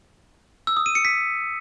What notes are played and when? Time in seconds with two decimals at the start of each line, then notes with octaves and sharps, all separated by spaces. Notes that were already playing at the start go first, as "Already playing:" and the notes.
0.67 E6
0.77 D#6
0.86 D#7
0.95 C#7
1.05 B6